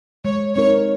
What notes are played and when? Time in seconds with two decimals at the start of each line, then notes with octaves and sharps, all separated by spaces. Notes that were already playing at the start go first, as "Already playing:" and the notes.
0.25 G#3 C#5
0.56 C4 D#4 A#4 C#5